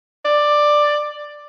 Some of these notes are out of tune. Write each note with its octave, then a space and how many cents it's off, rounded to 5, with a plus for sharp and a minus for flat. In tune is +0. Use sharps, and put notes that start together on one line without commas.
D5 +10